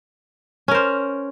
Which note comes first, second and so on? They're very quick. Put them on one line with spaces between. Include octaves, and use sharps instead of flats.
C#4 A#4 C5